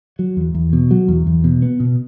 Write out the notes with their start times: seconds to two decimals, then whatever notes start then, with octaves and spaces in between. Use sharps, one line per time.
0.19 F#3
0.37 E2
0.55 E2
0.73 B2
0.91 F#3
1.08 E2
1.27 E2
1.44 B2
1.62 B3
1.80 B2